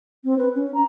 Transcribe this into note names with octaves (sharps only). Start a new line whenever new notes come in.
C4
B4
C#4
A#5